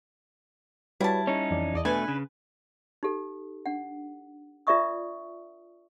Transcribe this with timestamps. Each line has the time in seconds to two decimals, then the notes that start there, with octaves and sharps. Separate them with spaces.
1.01 G3 E4 F#4 B4 C#5 A5
1.27 C#4 D#4 C#5
1.51 F2 E3 D5
1.74 E2 D5 D#5
1.85 B2 A3 D4 B4 G#5 B5
2.08 C#3
3.03 D#4 G4 A4
3.66 D4 F#5
4.67 F4 A#4 D5 E5 C#6 D#6